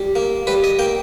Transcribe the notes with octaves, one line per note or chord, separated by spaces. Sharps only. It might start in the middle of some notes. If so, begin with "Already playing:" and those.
Already playing: G3
A#3
G3 B4
D#5
A#3 G5